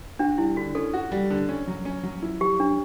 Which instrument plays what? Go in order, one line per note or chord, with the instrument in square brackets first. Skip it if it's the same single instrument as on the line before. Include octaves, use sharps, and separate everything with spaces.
[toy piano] D4 [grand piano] F#4
[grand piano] G3 [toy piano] E4
[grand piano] D3 [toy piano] F#4
[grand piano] C#4 [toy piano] A4
[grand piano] F#4
G3
D3
C#4
F#3
C#4
F#3
E4
[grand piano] F#3 [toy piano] G4
[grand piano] C#4 [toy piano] D4